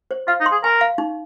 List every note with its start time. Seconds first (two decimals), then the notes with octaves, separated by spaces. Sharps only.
0.11 C5
0.28 F4 F5
0.40 D#4
0.46 C6
0.52 G#4
0.64 A#4 G#5
0.81 F5
0.98 D#4